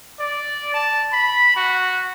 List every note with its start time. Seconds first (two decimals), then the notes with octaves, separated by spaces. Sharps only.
0.20 D5
0.74 A5
1.13 B5
1.56 F#4